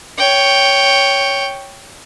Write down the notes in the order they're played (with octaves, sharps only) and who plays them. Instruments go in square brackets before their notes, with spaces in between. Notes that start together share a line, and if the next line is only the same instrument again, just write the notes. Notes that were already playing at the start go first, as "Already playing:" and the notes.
[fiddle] C#5 G5